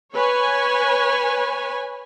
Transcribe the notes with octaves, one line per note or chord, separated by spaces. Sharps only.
B4 C#5 G#5